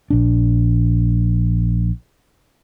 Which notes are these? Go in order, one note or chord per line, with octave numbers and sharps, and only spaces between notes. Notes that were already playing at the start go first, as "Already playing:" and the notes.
A#1 D4